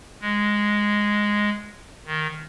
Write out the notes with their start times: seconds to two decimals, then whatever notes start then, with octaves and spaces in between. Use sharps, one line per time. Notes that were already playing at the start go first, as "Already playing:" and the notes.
0.21 G#3
2.06 D#3